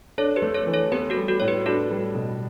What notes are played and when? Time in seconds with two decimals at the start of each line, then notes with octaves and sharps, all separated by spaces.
0.18 D4 A4 C#5
0.36 G4 B4
0.42 A3
0.55 A4 C#5
0.67 E3
0.74 A4 C#5
0.92 B3 G4 B4
1.10 F#4 A4
1.17 G3
1.28 F#4 A4
1.40 A2 C#5
1.48 G4 B4
1.66 D4 F#4 A4
1.91 G3
2.15 B2